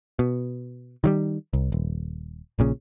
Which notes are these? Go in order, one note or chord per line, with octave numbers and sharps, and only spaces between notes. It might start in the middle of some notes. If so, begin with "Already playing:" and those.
B2
D#3 F#3 G3
C2
D#1
A#1 A#2 C#3